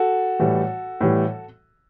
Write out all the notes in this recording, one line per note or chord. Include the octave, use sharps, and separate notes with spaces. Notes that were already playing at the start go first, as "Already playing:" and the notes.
Already playing: F#4 A4
A2 E3 G3
A2 E3 G3